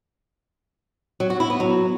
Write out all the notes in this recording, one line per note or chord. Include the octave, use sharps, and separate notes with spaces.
F#3
F#4
E4
B3
F#3